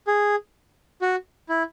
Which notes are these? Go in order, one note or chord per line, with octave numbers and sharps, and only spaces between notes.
G#4
F#4
E4